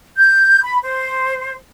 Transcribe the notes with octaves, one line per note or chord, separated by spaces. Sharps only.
G6
B5
C5